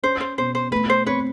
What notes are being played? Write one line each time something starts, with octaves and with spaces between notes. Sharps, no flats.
C#4 C5
C5
B2 C5
C5
A3 B4
C5
C4 B4 C#5